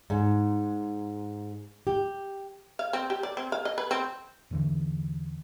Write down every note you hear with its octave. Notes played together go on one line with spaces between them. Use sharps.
G#2
G4
F5
C4
G4
D5
C4
F5
D#5
B4
C4
E2 D3 E3